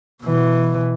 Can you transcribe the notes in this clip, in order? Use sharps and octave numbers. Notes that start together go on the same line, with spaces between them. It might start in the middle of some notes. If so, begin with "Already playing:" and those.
B2 E3